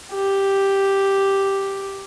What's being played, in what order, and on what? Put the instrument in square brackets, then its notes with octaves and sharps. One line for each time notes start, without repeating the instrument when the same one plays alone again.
[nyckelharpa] G4